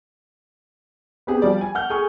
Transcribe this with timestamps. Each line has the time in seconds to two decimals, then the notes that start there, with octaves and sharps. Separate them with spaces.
1.27 B3 C4 G4 G#4
1.42 F3 G3 D5
1.61 G#5
1.75 F#5 F6 G6
1.90 G#4 A4 G#5 C#6